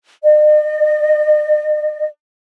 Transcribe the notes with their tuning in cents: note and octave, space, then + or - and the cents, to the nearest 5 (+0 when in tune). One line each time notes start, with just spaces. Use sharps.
D#5 -45